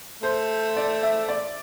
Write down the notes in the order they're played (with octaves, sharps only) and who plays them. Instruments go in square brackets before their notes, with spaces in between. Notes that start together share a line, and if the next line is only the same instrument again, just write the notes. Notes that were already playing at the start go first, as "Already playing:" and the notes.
[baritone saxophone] A3 [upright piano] C5
[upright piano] D5
E5
D5